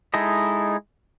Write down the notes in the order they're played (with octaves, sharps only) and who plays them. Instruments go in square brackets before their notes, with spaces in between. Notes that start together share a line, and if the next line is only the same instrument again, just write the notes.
[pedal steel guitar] G#3 D#4 E4 A4 D#5